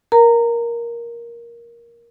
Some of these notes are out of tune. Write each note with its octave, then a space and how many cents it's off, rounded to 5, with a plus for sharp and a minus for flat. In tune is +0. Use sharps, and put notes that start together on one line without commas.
A#4 +10 A#5 -20